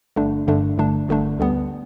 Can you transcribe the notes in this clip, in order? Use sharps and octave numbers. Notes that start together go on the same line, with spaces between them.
G1 G2 D3 A3 D4
G1 G2 D3 A3 D4
G1 G2 D3 A3 D4
G1 G2 D3 A3 D4
D2 D3 G3 B3